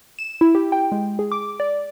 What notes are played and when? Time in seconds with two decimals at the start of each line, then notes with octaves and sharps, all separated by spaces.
0.19 E7
0.41 E4
0.55 G4
0.72 G5
0.92 G#3
1.19 G#4
1.32 D6
1.60 D5